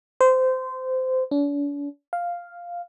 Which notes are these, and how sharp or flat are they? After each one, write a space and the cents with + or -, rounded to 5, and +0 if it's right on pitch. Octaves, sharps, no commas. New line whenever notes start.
C5 -20
D4 -45
F5 +0